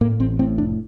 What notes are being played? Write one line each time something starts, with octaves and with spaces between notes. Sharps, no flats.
A2 A#3
A1 C4
A2 C4
F1 D4